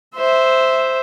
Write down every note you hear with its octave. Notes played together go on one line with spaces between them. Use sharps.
C5 E5